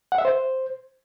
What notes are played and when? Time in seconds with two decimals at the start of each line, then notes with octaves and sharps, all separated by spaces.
0.12 F#5
0.18 E5
0.25 C5